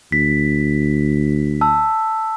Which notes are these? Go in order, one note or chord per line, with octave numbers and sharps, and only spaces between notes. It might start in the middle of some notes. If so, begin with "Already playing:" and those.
D2 B6
A5 E6